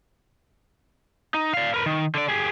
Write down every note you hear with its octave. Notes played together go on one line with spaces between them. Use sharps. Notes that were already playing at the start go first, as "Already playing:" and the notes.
D#4
D5 F5
A#4 B4
D#3
D3 D5
G4 G#4